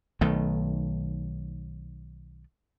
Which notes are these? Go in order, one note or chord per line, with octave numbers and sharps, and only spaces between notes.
B1 D#3 A3